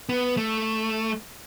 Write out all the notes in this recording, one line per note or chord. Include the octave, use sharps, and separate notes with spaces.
B3
A3